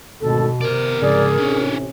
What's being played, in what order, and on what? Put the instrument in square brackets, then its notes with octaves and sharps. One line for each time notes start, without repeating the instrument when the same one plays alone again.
[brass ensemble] G#1 D2 [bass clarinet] B2 [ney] A4
[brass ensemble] C3 [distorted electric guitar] B3 D5 [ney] A#4
[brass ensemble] C2 D5 [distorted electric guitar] G#2 C#3 [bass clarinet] G#4
[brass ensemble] A1 C3 C#4 [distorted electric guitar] D4 C#5